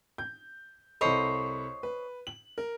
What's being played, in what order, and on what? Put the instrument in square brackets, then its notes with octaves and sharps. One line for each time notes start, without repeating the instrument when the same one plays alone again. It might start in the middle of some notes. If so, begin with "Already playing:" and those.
[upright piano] G6
[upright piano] C2 A4 B5 [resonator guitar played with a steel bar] C5 C#5 D#5
[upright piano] B4
F#7
A#4